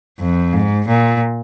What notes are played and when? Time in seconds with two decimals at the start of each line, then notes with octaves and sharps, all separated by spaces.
0.19 F2
0.53 G#2
0.88 A#2